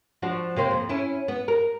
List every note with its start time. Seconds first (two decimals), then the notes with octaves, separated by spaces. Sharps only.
0.22 F3 D4 F#4
0.56 C3 A#3 C5
0.71 F2
0.89 C#4 E4
1.28 B3
1.48 A#4